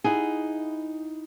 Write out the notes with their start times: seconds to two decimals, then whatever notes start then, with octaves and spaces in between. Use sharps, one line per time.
0.04 D#4 E4 G#4 F#5